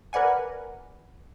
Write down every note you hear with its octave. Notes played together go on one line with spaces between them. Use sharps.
A#4 B4 D5 F#5 G#5